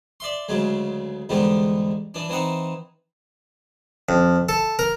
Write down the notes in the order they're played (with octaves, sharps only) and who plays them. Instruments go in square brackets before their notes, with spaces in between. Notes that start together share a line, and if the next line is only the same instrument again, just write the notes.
[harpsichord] D5 E5 C6
D2 C#3 F#3 G#3
E2 G#2 D3 G3 B3
E3 D4
E3 C4 D#4 F#5
F2
A4
A#4